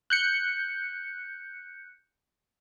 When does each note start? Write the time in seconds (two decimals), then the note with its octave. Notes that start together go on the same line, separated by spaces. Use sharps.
0.10 F#6 G6 C#7